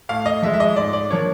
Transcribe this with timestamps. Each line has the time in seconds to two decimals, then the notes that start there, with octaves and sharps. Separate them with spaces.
0.09 A2 F5
0.26 D#5
0.42 F3 G#3 E5
0.54 E5
0.60 D#5
0.76 G#2 D5
0.93 D5
1.10 F3 A#3 D4 C#5